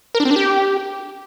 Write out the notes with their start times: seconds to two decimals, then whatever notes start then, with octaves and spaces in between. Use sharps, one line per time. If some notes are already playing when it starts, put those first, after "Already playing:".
0.15 A#4
0.20 D4
0.25 C4
0.31 D4
0.36 G4